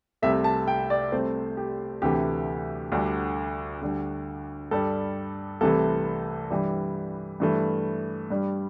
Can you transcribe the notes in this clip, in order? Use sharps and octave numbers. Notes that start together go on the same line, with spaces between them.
C2 C3 A3 E5
A5
G5
D5
C2 C3 A3 C5
G4
D2 C3 E3 A3 G4
D2 D3 G3
D2 D3 G3
G2 G3 A4
C2 C3 E3 A3 A4
G2 E3 G3 G4
G2 E3 A3
G2 G3